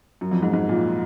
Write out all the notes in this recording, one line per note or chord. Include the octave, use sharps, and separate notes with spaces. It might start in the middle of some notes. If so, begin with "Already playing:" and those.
F#2
F2
G#2
G#2
A#2